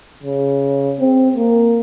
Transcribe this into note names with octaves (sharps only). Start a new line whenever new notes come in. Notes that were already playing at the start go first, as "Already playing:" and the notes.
C#3
C4
A#3